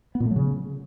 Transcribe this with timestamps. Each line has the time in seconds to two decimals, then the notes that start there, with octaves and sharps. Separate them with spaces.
0.15 B3
0.20 A#2
0.25 A3
0.31 F#3
0.36 C#3